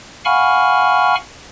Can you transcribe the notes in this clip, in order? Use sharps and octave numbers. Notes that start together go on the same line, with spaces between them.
F5 F#5 G#5 B5 C#6 F6